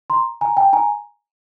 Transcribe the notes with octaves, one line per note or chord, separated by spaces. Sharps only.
A#5 C6
G#5 A#5
G5 A5
G#5 A#5